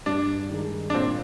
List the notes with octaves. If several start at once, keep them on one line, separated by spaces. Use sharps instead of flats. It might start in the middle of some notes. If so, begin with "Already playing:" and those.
G2 D4
D#3 G#3 D#4
D4
A#2 C4